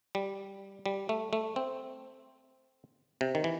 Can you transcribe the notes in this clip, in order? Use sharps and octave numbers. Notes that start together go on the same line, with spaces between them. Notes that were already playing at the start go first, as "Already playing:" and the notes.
G3
G3
A3
A3
C4
C3
D#3
E3